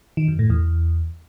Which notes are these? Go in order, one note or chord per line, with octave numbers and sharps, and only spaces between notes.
D#3
F#2
A2
E2